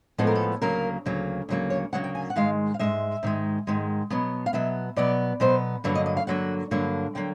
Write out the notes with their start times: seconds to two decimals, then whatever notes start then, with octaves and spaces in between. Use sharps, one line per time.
0.18 A2 F3 G#3 B3 A4
0.27 A#4
0.35 A4
0.62 D2 C#3 F#3 A#3 A#4
1.06 D2 C#3 F#3 A#3
1.49 D2 C#3 F#3 A#3
1.70 C#5
1.93 D2 C#3 F#3 A#3 F#5
2.04 G5
2.15 G#5
2.30 F#5
2.36 G#2 D#3 G#3 F5
2.74 F5
2.79 G#2 D#3 G#3 E5
3.23 G#2 D#3 G#3
3.67 G#2 D#3 G#3
4.10 B2 F#3 B3
4.46 F5
4.53 B2 F#3 B3 E5
4.96 B2 F#3 B3 D5
5.40 B2 F#3 B3 C5
5.84 G2 D3 F#3 A#3 B4
5.95 D#5
6.06 D#5
6.17 F5
6.27 G2 D3 F#3 A#3 F#5
6.71 G2 D3 F#3 A#3
7.15 D3 F#3 A#3 G5